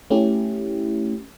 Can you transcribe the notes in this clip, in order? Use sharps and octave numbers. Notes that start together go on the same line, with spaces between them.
A3 C#4 E4 G4